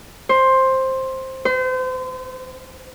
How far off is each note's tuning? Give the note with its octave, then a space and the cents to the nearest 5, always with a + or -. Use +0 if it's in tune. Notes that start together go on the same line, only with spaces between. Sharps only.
C5 +10
C5 -35